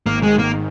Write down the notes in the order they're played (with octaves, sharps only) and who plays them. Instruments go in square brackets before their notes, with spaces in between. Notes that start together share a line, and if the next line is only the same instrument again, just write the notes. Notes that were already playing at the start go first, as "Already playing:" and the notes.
[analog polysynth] G#1 G#2 D#3 [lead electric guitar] A#3
[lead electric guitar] G#3
A#3